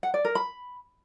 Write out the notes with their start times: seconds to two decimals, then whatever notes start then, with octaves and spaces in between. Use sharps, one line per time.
0.03 F#5
0.14 D5
0.25 A#4
0.35 B5